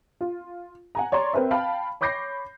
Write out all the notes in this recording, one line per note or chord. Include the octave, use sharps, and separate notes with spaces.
F4
F#5 G#5 A#5
C#5 D5 A#5 C6
C4 A#4 B4 E5
F5 G5 A5 B5
C#5 B5 D6 G6 A#6 C7